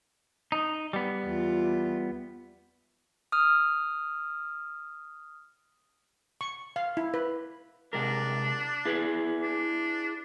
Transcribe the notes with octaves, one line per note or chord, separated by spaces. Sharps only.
D#4
G3 B3
E2 F4
D#6 F6
C#6
F5
E4
B4
C3 G#3 D4 A#4
E4 G#4 B4
D4